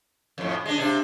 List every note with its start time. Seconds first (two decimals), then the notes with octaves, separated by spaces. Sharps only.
0.38 F2 A2
0.66 G#3 D4
0.78 C3 D4